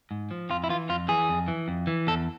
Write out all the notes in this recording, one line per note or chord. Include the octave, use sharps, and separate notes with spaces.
G#2
F3
F2 F4
E4
E3 F4
F2 F4
E3 G#4
F2
E3
F2
E3
E2 A4